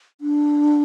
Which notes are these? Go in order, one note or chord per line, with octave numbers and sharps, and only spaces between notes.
D4